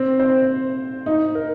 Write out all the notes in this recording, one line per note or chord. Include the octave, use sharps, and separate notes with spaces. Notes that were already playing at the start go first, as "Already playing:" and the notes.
Already playing: C4
C5
D#4
A#4